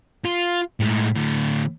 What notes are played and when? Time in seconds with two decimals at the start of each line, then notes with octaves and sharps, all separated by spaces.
0.25 F4
0.80 A2 G#3
1.15 A2 D3